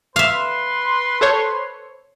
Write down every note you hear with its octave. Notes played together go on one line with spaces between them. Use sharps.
B4 E5 F5 C6
A4 C5 C#5